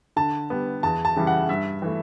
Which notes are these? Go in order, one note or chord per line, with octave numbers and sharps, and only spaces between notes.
D3 A5
G3 B3
E2 A5
A5
C#3 E3 G3
F#5
G2 E5
E3 A3